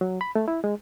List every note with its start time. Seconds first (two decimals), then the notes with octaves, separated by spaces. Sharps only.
0.01 F#3
0.21 B5
0.35 A3
0.48 E4
0.64 G#3